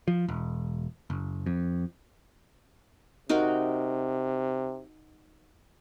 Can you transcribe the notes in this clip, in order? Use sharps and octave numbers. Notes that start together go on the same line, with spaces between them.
F3
E1
F#1
F2
C3 D#4 F#4 A#4